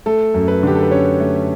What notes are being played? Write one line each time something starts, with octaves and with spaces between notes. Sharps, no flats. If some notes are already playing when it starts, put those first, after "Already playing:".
A3 A4
F#2
B4
D3 G4
A4
B4
C#4 C#5
A3